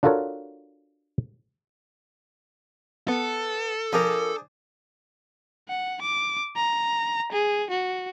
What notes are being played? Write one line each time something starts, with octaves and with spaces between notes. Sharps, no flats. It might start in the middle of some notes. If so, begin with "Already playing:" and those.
D4 F4 F#4 A4 A#4 C#5
B3 A4
F3 D4 G#4 A#4 C5
F#5
D6
A#5
G#4
F#4